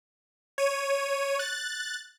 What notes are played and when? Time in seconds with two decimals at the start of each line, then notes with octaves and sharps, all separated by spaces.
0.58 C#5 D#7
1.39 F#6 A6